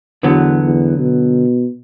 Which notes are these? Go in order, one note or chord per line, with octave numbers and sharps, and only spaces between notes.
E2 D3 F#3 B3
E2
B2